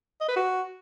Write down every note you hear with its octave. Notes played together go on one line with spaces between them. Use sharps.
D#5
B4
F#4